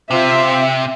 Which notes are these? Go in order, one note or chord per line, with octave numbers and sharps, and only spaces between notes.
C3 C4 F4 E5